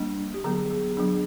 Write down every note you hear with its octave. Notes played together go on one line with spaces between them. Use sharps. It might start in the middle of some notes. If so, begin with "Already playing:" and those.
Already playing: G3 A#3 D4
G4
D3 F#3 B3 G#4
G#4
F#3 B3 D4 G#4